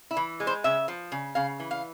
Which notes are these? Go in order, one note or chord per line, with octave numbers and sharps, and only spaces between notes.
E4
E3
G#3
C5
C#3 E5
F3
C#3
C#3 F5
E3
F5